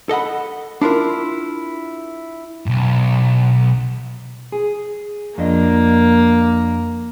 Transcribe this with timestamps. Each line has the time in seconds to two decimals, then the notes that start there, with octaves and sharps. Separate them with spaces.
0.09 A4 D#5 F#5 B5
0.81 D4 E4 F4 A#4
2.66 B1 G#2
4.52 G#4
5.38 F2 A#3 D4 D#5